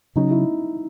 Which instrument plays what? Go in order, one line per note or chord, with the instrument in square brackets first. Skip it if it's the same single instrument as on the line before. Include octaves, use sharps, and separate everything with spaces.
[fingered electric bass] C#3 F#3 C#4 [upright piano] D#4
[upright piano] E4